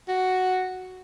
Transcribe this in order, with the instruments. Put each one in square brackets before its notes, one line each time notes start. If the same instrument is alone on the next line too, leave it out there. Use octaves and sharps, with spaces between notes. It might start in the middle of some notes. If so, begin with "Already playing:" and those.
[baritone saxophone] F#4